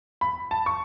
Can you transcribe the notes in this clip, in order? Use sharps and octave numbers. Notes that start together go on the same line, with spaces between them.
B5
A5
C#6